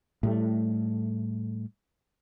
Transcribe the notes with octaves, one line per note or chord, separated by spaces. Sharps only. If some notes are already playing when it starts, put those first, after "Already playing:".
A2 G3 A3